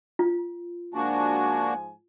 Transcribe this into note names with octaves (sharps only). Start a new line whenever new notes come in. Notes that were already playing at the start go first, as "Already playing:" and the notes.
F4
G#2 F3 A#3 D4 F#4 G#5